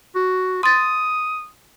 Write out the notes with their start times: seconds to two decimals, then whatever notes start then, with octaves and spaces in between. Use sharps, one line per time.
0.15 F#4
0.63 C6 D#6 A6